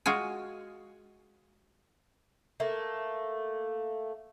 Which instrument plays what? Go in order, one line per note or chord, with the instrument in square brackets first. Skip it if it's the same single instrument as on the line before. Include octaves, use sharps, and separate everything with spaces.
[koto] G#3 F4 F#4 G#5
[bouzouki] A3 A#3